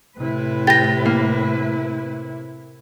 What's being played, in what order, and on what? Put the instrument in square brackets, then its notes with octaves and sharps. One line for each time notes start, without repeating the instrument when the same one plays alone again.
[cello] A2 B4 [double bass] C3 E4
[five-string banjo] G4 [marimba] A6 A#6
[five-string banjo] A#3